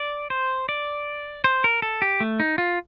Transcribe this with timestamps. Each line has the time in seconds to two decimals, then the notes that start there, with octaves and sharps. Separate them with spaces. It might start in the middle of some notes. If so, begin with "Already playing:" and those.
Already playing: D5
0.30 C5
0.69 D5
1.44 C5
1.64 A#4
1.82 A4
2.02 G4
2.20 A3
2.40 D#4
2.58 F4